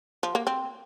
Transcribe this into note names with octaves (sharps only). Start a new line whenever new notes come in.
F3
A#3
C4